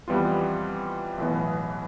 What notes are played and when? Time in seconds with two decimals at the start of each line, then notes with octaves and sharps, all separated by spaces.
0.08 F2 E3 G3 B3 F4
1.18 B1 A2 E3 B3